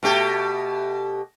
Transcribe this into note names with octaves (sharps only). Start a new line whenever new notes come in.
B2 A3 G4